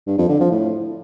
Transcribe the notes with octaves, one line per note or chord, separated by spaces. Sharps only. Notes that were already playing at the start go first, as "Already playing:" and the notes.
G2
F2
D3
F3
A2